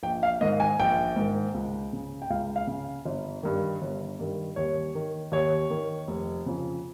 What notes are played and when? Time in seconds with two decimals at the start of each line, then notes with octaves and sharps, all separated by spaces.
0.03 A#1 G5
0.23 F5
0.41 G#2 D#3 D#5
0.60 G#5
0.80 A#1 G5
1.16 G#2 D#3
1.54 C#2
1.93 C#3
2.22 G5
2.30 C#2 F5
2.56 F5
2.67 C#3
3.05 G1
3.43 G2 D#3
3.82 G1
4.19 G2 D#3
4.56 D#2 C#5
4.95 D#3
5.32 D#2 C#5
5.70 D#3
6.07 F1
6.46 F2 C#3